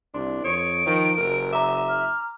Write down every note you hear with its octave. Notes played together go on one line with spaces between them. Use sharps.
C2 D4 C6
F2 C#5 D#6 D7
D#3 F3 C5
F#1 A#4
E5 A#5 C6 D6
F6